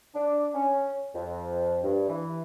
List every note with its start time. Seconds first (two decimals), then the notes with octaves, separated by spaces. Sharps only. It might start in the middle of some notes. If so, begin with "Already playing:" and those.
0.15 D4
0.54 C#4
1.14 F2
1.83 G2
2.09 E3